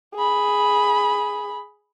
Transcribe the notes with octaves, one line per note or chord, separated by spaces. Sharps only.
G#4 B5